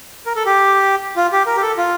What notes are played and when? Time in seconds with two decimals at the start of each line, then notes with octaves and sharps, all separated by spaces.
0.26 A#4
0.36 A4
0.46 G4
1.16 F4
1.32 G4
1.46 A#4
1.57 G4
1.62 A4
1.77 F4